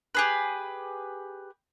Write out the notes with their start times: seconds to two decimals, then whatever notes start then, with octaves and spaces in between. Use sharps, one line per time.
0.15 G4 G#4 B4